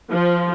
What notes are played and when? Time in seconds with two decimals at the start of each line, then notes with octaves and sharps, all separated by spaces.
0.11 F3